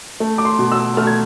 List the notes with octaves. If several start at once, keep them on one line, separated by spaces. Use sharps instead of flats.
A3
D6
C6
B2
E6
A3 F6
G#6